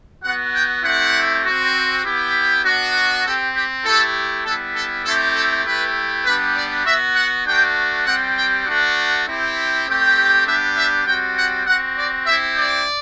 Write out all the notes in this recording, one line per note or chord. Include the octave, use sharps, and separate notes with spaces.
B3 F#4 F#5
G5
A3 C4 E4 G4 F#5
C4 F#4
B3 E4 G4
B3 D4 F#4
C4 G4 A4
G4
A3 E4 G4 A4
G3 B3 E4 A4
A4
A3 C4 E4 G4 A4
A4
A3 E4 G4 B4
G3 B3 D4 G4 B4
D5
B3 F#4 E5
F#5
A3 D4 F#4 G5
G3 C4 G4 F#5
G5
A3 D4 F#4 F#5
C4 E4 G4
A3 C4 G4
G3 B3 D4 G4 E5
E5
G3 C4 F#4 G5
F#5
C4 F#4 F#5
D5
C4 E4 G4 E5
D5